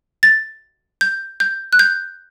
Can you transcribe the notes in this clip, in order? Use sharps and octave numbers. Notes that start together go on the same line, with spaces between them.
A6
G6
G6
F#6
G6